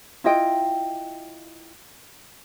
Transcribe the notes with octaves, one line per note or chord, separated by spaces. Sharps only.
E4 F4 D#5 G5